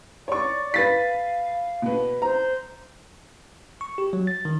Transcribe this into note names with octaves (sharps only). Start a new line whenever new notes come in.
C#5 D5 C#6
B4 F5 A6 B6
B2 B3
C5 A#5
C#6
G4
F#3
A6
D#3